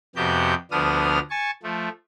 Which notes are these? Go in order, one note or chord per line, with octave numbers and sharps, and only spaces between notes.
F2 C3 B3 F#4 G4 G6
D2 F3 B3 D4 D#6 F6
G#5 A5 C#6
F3 A3